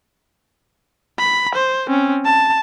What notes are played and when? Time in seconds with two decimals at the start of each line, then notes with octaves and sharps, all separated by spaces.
1.19 B5
1.56 C5
1.88 C4 C#4
2.25 A5